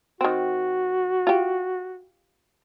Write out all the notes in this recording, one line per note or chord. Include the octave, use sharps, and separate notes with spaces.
D#3 C4 F#4
F4 G4